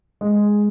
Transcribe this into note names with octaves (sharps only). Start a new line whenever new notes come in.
G#3